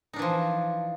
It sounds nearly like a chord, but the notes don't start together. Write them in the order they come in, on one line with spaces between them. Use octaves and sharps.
D#4 D4 E3 F3